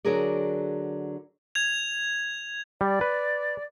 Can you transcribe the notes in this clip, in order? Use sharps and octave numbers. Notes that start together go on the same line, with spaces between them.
D3 F#3 G#4 A#4 D5
G#6 F7
G3 D5
B4